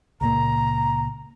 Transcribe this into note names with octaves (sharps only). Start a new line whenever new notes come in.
C#2 A#2 A#3 A#5